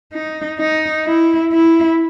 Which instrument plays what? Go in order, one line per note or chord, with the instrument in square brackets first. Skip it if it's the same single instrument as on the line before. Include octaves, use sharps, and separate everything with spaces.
[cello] D#4
D#4
E4
E4